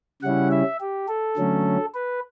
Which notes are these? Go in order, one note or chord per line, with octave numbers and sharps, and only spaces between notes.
C#3 G3 C#4 E4 F#5
E5
G4
A4
D3 F#3 A3 C#4
B4